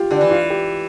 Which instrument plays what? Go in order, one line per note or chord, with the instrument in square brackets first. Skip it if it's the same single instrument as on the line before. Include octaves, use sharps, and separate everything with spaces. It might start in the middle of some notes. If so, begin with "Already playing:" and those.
Already playing: [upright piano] F4 G4
[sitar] D3 [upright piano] G4
[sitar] E3
[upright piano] F4
G4